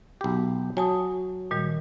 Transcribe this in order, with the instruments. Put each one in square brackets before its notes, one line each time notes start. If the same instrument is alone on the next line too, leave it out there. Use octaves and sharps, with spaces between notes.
[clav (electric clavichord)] B1 G4
[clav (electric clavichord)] F#3 [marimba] G#5 A5 D#6
[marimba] A#2 D#3 G3